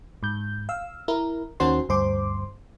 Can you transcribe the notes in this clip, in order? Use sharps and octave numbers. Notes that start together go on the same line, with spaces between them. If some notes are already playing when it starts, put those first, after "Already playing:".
G#2 G6
F5 E6
E4 A#4
D#2 D#3 C#4 F#4 C5 C6
D2 G2 C5 C6 D6